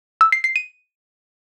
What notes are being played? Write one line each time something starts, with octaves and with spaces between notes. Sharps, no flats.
E6
C7
C7
D#7